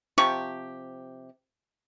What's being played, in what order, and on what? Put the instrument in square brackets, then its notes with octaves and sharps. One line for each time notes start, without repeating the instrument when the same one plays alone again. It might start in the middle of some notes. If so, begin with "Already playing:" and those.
[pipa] C3 F3 G4 C#6